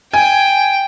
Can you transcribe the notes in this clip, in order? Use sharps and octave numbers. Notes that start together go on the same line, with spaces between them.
G5 G#5